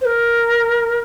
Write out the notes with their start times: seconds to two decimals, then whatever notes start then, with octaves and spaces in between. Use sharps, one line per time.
0.01 C5
0.05 A#4